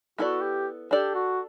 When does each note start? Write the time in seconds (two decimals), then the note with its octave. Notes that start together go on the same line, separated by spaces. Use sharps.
0.18 B3 E4 F#4 A4 D5
0.42 G4
0.91 D4 G4 A4 D5
1.15 F#4